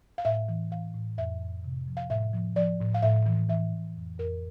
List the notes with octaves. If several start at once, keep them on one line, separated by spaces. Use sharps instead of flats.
F5
A2 E5
E3
E3 F5
A2
F2 E5
F2
C3
F3
F5
A2 E5
F3
F3 D5
A2
F5
A2 E5
E3
E3 E5
A2
F2
F2 A#4